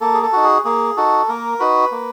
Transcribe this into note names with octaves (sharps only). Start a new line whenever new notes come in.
A#3 A4
G#4
A4
D#4 F#4
G#4
A#3 G#4
D#4 F#4 A4
A#3 A#4
D#4 F#4 B4
A#3